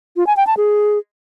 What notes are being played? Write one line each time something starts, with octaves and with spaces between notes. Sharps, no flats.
F4
G#5
G5
A5
G#4